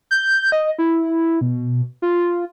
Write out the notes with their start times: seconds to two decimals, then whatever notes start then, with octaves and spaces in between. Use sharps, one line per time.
0.11 G6
0.52 D#5
0.78 E4
1.41 B2
2.02 F4